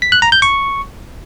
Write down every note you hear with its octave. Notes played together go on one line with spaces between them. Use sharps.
B6
F#6
A#5
G6
C#6